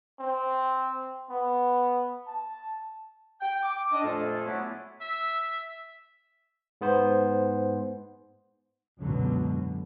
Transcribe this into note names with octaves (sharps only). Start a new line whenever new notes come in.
C4
B3
A5
G5
D6
D4 D#5
F2 A#2 A3 F4 G#4 A4
F#3 A3 B3 C#4 D4 E4
E5
G#2 B3 C5
C#2 F#2 B2 D3 F#3